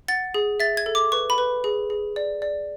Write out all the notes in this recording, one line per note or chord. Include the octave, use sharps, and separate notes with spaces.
F#5 A6
G#4
E5 A6
G#6
A4
D6
B4 C#6
B5
B4
G#4
G#4
D5
D5